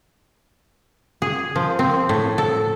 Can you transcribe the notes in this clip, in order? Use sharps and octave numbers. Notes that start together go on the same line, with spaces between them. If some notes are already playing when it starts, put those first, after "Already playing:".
G#4
F3
C4
A2
A4